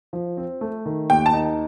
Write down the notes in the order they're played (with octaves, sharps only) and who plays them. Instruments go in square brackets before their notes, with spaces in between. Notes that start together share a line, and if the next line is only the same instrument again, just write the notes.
[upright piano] F3
C4
A3
D#3
[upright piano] D#2 [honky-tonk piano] G5
[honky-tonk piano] A5
[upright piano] D#4